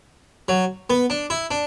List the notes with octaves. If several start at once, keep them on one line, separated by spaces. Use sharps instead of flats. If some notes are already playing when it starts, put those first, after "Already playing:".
F#3
B3
D4
E4
D4